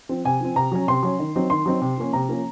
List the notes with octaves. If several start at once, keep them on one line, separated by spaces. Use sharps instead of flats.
F3 C4
C3 G#5
F3 C4
C3 A#5
F#3 C#4
C3 C6
F#3 C#4
D#3
F#3 C4 D#4
D#3 C6
F#3 C4 D#4
C3
F3 A#3 C#4
C3 A#5
F3 A#3 C#4